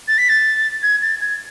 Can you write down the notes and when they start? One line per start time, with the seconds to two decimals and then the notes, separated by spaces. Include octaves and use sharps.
0.08 A6
0.18 B6
0.29 A6
0.83 G#6
1.02 A6
1.21 G#6